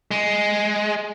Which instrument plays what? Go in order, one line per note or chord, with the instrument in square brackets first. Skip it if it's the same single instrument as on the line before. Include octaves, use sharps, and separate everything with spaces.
[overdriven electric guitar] G#3